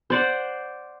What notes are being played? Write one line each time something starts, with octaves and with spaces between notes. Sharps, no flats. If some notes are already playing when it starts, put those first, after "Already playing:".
C5 D5 F#5